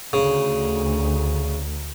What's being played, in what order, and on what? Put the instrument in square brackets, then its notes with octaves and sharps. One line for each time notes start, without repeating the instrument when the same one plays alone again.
[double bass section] D2 [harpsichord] C#3